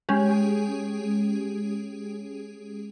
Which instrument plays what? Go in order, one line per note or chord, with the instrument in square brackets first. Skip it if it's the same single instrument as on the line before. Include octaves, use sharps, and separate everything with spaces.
[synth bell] G#3 C#4 G4 G#4